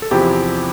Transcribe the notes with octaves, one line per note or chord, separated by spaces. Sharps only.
A4
E2 C3 F3 C4 E4 G4